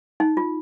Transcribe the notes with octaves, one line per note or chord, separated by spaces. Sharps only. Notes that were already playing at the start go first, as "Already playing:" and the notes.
D#4
F4